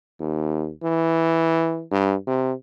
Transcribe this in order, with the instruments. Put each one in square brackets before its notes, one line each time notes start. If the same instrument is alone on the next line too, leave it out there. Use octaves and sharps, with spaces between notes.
[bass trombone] D#2
E3
G2
C3